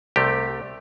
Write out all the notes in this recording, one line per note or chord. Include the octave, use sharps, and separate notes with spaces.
C2 C3 A3 G4